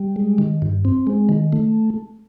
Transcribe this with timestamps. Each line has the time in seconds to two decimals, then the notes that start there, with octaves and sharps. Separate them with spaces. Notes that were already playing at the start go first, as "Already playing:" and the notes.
Already playing: G3
0.16 G#3
0.38 D#3
0.62 G2
0.85 C4
1.07 G#3
1.29 D#3
1.52 A3